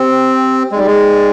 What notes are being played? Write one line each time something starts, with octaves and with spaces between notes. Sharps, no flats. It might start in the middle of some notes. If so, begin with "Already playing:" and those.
Already playing: C4 G4 C5 G5
G#3 D#4 G#4 D5 G5
G3
G#3